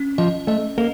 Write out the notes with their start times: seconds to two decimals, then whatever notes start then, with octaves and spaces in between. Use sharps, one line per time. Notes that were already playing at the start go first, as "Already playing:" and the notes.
Already playing: C#4
0.18 F3 D#5
0.47 A3 D#5
0.78 A#3 A4